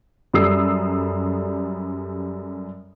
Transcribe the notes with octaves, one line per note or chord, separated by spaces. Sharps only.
F#2 G3 A4 D#6 E6 C7